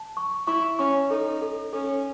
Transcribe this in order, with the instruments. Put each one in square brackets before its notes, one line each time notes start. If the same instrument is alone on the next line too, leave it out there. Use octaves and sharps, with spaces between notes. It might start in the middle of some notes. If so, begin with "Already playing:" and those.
Already playing: [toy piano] A5
C#6
[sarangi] E4 [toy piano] C#6
[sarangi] C#4 [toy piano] C#6
[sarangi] D#4 [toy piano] A4
[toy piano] A4
[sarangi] C#4 [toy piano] A4